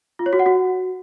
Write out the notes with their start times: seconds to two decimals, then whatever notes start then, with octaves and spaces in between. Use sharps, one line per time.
0.19 F4
0.26 C#5
0.33 F#4
0.39 F#5
0.46 F#4